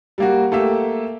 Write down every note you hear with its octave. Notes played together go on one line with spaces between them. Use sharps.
G3 A#3 F#4
A3 A#3 G4 E5